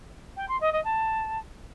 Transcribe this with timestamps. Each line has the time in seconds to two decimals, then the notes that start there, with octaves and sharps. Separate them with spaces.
0.37 G5
0.49 C6
0.61 D#5
0.72 D#5
0.84 A5